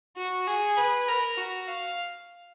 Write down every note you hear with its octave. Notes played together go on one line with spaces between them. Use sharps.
F#4
G#4
B4
A#4
F#4
F5